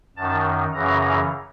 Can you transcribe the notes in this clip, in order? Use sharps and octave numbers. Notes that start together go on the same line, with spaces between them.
F#2 D#3 A5
F#2 C#3 E3 A#5